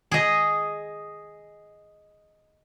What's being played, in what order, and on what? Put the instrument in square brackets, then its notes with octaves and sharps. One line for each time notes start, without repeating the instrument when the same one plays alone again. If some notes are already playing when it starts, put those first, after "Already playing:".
[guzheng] G#4 D#5